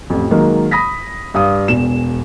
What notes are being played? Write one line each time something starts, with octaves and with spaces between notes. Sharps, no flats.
A1 F2
D#3 F#3 G#3 A#3
B5 D#6 A#6 B6
G2 F5 D#6
E1 E2 E7